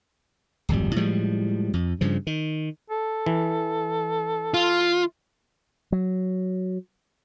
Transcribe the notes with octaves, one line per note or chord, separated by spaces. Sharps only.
D1 G#1 F2 G3
A2 F3 G3 G#3
F2
G2 C#3 F3
D#3
A4
E3
F4
F#3